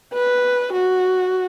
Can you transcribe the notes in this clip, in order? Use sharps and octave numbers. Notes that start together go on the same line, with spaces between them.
B4
F#4